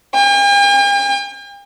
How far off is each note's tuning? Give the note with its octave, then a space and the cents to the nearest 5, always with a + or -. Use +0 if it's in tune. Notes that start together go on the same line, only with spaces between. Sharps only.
G5 +45